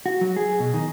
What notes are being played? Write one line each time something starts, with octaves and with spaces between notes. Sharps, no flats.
F#4
F#3
G#4
B2
D#3